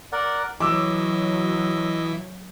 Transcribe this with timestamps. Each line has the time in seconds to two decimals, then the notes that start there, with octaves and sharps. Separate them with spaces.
0.12 A#4 D5 F#5
0.60 E3 F#3 D#5 D6 E6